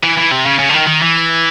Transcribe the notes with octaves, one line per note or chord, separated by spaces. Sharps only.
E3
E3
C3
C#3
C#3
D3
D#3
D#3
E3